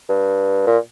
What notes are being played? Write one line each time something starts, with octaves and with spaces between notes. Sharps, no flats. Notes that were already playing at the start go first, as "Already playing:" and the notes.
G2
A#2